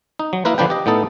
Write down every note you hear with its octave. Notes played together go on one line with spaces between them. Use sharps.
D#4
F#3
A#3 E4 A#4 B4
D3 F3 D4 B4 G5
G4 D#5
A2 B3 D#4 A4